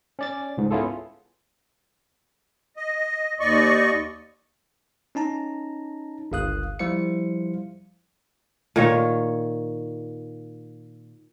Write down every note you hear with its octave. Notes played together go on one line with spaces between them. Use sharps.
C#4 D5 A6
C#2 G#2
B3 C#4 E4 F4 G#4 A4
D#5
D#2 D5 D#5 C#6
C#4 D#4 A5 A#5
G1 C#2 F5 D#6 F#6
F3 G3 E4 C5 F5 C#7
A#2 D#3 C#5